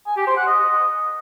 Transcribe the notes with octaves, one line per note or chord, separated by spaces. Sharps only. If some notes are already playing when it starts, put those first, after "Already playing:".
G#5
G4
C5
F#5
D#5